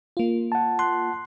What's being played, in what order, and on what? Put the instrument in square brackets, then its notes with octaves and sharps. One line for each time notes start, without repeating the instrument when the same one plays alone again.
[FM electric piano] A#3 F4
[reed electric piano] F#5 A5
[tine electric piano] C6 F#6